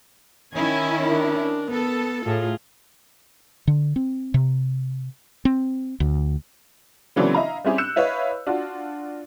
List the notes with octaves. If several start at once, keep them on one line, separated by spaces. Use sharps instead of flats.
D#3 C#4 E4 G#5
D4 A#4
B3 A4
A2 F4 G#4
D3
C4
C3
C4
D2
C#3 E3 F#3 A#3 C4 D4
E4 D#5 F5 A#5
G3 C4 C#4 E4 G4 G#4
E6 F#6 G6 C#7 E7
E4 B4 C#5 D#5 F5
D4 F4 F#4